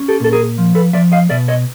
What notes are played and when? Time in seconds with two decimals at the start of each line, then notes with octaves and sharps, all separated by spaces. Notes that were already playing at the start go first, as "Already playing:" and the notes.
Already playing: C#4
0.08 G4 A4
0.20 A#2 A4
0.33 G#4 A#4
0.58 F3
0.75 A4 B4
0.93 F3 D5 E5
1.12 D#5 F5
1.30 B2 D5 E5
1.48 C#5 D#5